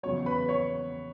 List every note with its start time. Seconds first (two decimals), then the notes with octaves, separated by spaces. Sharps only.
0.03 E2 C#3 F#3 C#5 C#6
0.26 B4 B5
0.49 C#5 C#6